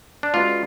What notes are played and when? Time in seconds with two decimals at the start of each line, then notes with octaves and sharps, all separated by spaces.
0.23 D4
0.34 G#3 C#4 F4 F#4 B4 D5